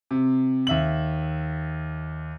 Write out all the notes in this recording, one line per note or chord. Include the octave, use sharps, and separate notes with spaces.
C3
D#2 E5 F#7